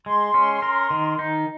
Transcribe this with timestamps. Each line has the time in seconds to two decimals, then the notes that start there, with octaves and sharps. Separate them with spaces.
0.05 G#3 C6
0.34 C#4
0.62 A#4
0.91 D#3
1.19 D#4